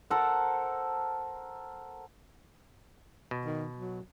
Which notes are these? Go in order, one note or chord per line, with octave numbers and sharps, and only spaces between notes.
A4 A#4 C5 F#5
B2
D#3
F#3